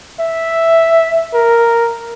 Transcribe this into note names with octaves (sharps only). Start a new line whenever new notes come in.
E5
A#4